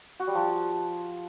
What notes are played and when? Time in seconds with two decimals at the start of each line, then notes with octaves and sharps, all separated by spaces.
0.20 F#4
0.27 G3
0.35 F3